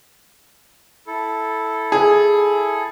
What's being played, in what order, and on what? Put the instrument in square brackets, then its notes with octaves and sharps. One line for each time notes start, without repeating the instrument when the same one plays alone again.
[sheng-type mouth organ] E4 A4
[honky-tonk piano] G#4